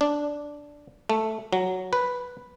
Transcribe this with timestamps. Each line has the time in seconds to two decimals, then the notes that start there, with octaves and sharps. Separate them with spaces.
0.01 D4
1.10 A3
1.53 F#3
1.93 B4